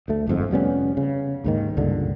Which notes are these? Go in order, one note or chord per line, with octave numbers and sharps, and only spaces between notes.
D2 A3
G1 F2 G#2
F1 G3 B3 C#4
C#3
D#2 G#2 D#3
C#2 G2 A#2 D3